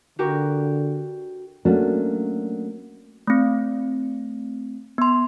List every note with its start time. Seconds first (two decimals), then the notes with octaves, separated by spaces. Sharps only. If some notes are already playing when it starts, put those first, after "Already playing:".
0.19 D3 F#4 G4 A#4
1.65 F#3 A3 A#3 C#4 D4 F#4
3.27 A3 C4
4.98 B3 C6